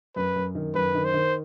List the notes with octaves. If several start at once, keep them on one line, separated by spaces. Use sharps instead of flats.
F#2 B4
F#2
D#3
F#2 B4
D#3
C5
D#3